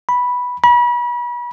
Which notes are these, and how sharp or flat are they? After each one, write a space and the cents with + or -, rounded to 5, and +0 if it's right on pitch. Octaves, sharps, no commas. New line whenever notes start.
B5 -5
B5 -35